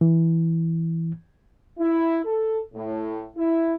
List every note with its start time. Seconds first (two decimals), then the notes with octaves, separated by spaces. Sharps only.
0.01 E3
1.79 E4
2.25 A4
2.74 A2
3.37 E4